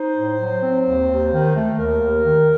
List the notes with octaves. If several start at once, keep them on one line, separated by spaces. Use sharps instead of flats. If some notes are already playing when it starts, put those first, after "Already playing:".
Already playing: D#4 C5
A2
F#3
C4
D#2
D#2
D#3
A3
D#2 A#4
D#2
D#3